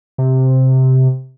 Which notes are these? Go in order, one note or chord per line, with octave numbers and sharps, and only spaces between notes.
C3